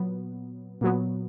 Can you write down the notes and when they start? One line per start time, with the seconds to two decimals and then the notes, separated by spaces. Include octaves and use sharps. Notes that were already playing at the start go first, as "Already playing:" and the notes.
Already playing: A#2 F#3 B3
0.81 A#2 F#3 B3